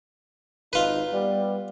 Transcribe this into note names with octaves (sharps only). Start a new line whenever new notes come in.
G#1 D#4 F4 B4
G3 B3